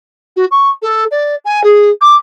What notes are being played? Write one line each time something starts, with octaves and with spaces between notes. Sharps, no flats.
F#4
C#6
A4
D5
G#5
G#4
D6